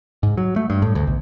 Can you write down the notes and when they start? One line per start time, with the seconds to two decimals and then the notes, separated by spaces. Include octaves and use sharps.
0.23 G#2
0.37 F#3
0.56 A3
0.70 G2
0.82 A2
0.95 D2
1.07 B1